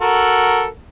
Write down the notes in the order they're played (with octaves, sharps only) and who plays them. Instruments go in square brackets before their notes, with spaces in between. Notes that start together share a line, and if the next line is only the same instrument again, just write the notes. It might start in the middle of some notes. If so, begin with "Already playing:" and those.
[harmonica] F#4 A4 A#4